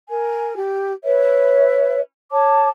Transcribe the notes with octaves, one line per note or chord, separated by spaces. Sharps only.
A#4 G#5
G4
B4 C#5 E5
C#5 A5 D6